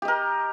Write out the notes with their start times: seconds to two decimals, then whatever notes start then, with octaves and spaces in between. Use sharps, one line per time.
0.02 G4
0.05 D#5
0.08 A#4